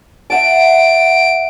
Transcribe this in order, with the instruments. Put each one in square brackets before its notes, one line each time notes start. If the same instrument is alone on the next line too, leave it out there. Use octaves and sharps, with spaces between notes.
[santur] E5 F#5 A5 [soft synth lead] D7